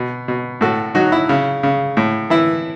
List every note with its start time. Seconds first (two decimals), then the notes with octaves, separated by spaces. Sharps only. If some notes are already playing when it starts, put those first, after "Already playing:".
Already playing: B2
0.28 B2
0.61 A2 F#4 A4
0.95 F#3 D#4 F#4
1.12 E4
1.29 C#3
1.63 C#3
1.97 A2
2.30 E3 E4